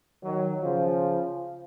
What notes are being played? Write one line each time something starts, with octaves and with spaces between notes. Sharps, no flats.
D#3 F#3
C#3 F3